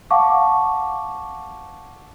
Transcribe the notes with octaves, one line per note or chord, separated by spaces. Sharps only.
F5 F#5 A5 C#6 D6